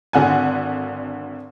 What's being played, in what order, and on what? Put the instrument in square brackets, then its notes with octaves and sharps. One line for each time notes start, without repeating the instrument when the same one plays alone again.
[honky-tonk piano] G#1 D3 F#5 G#5